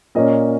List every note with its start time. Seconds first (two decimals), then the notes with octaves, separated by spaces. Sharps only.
0.15 A#2 A#3 C#4 D#5